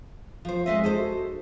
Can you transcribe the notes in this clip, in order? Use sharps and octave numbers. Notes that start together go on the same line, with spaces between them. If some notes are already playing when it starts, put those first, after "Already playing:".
F3 C5
G#3 C4 D#5 E5
D#4 G#4 A4 C5
F#4